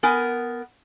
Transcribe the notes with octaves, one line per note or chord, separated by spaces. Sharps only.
B3 A#4 G#5